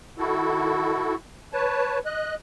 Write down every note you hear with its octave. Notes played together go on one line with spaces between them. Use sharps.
D#3 E4 F#4 A4
B4 C#5 A5
D#5 F#6